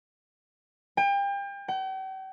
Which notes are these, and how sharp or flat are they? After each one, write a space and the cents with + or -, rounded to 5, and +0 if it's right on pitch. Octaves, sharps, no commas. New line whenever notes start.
G5 +35
G5 -45